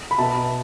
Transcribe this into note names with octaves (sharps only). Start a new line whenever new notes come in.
B5
B2 B3 E5 A5